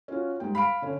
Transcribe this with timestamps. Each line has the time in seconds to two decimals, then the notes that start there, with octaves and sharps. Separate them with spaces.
0.08 C#4 F4 F#4
0.40 G#2 G3 G5
0.55 F5 B5 B6 D7
0.82 D3 C#4